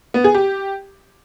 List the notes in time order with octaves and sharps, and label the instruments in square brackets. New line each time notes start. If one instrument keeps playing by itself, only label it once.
[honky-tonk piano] B3
G#4
G4